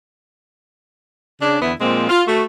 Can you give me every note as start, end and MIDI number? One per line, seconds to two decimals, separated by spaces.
1.41 1.60 49
1.41 1.60 62
1.61 1.73 40
1.61 1.73 50
1.61 1.73 59
1.61 1.73 64
1.81 2.06 46
1.81 2.06 53
1.81 2.06 56
1.81 2.06 58
1.81 2.06 60
2.10 2.22 65
2.26 2.43 57
2.26 2.43 66